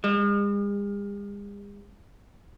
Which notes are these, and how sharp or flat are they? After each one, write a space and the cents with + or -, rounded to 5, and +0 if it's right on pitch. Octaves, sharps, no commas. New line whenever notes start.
G#3 -45